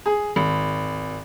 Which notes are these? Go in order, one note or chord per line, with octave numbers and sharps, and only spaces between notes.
G#4
G#1